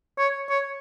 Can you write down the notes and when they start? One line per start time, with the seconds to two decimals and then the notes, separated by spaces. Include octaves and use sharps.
0.18 C#5
0.50 C#5